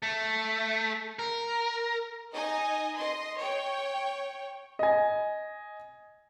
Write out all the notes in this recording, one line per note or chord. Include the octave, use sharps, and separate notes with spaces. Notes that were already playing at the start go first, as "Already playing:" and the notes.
A3
A#4
D#4 D#5 G#5
D#5 C6
C#5 G5
D#5 G#5